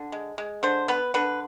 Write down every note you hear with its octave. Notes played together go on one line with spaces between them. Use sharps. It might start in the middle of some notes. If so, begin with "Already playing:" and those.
Already playing: D3
G#3
G#3
D3 C5
B3 B4
D3 B4